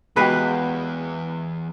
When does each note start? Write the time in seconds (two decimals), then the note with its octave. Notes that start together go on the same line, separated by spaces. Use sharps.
0.16 E2 G#3 B3 F#4 G4 B4 F5